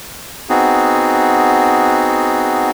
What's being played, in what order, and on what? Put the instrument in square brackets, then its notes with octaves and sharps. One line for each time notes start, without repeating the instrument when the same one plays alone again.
[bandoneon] B3 C4 D#4 F#4 G#4